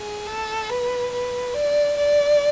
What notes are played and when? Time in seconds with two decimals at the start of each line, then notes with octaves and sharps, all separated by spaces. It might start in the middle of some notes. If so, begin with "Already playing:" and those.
Already playing: G#4
0.27 A4
0.69 B4
1.12 B4
1.54 D5
1.97 D5